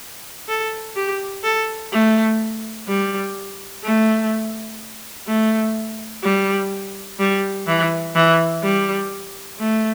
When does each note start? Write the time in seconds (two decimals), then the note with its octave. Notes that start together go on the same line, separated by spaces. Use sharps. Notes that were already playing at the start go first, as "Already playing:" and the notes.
0.48 A4
0.96 G4
1.44 A4
1.92 A3
2.88 G3
3.84 A3
5.27 A3
6.23 G3
7.19 G3
7.67 E3
8.15 E3
8.63 G3
9.59 A3